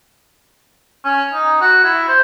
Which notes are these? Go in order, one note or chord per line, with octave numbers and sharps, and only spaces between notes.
C#4
D#4
F#4
E4
C5